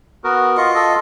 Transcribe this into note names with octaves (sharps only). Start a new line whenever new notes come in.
B3 F#4 A#4
F4 D#5 C#6
A4 D#5